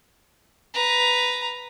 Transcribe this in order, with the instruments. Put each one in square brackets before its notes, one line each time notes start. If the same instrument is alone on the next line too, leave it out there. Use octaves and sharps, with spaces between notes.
[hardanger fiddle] B4 A#5